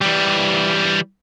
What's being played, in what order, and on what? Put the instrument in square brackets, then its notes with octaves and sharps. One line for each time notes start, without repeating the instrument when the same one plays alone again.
[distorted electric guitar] E3 G3